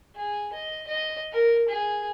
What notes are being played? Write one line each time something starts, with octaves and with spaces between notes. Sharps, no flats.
G#4
D#5
D#5
A#4
G#4